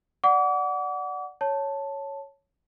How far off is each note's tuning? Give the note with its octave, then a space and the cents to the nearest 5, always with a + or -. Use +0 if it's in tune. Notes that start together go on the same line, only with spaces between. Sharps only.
D5 +0 F#5 +0 D6 -40
C#5 +0 A5 +0